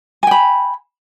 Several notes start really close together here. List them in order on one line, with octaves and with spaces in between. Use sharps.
G#5 G5 B5